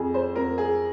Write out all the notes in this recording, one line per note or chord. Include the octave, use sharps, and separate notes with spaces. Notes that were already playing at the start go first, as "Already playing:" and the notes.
Already playing: F2 G#4
C5
F2 A#4
G#4